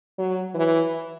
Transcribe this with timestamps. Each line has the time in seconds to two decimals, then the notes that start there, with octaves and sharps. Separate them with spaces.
0.18 F#3
0.55 E3